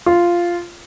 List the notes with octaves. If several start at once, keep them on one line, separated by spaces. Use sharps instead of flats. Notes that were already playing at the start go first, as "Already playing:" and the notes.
F4